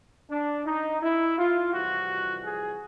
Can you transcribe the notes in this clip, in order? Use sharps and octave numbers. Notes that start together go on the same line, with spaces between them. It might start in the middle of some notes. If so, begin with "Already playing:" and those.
D4
D#4
E4
F4
F2 C3 E3 G3 F#4
G#4